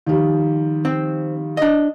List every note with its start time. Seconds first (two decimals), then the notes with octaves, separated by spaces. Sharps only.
0.06 D#3 F3 G3
0.85 C4
1.57 D4 D#5